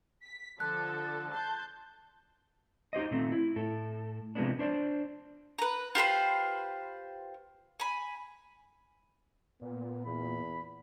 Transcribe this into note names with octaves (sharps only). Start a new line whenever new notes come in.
B6
D3 F3 A4 F#6
A5 C6 G6
D#4 G4 C5 D#5
A#2 D#3 A3 C4
E4
A2 A4
C3 F3 G#3 A#3 B3 D4
D4 C5 D5
B4 A#5
F4 G4 B4 C5
G#5 B5
A#2 B3
E2 B5